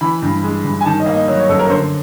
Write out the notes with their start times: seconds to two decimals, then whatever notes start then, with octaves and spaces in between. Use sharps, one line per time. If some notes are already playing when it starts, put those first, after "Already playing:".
0.01 E3 B5
0.22 G2
0.43 G#3
0.65 G2
0.81 G#5
0.85 D#3 A5
1.00 D#5
1.06 A#3
1.14 D#5
1.28 F#3
1.39 C#5
1.49 F#2 A4
1.59 A#4
1.70 D3 C5